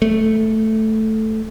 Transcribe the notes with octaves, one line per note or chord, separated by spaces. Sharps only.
A3